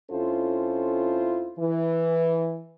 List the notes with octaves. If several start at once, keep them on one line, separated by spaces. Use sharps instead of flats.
F2 C#4 E4 F4 A4 C5
E3